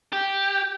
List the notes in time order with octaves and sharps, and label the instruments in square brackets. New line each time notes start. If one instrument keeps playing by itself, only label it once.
[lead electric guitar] G4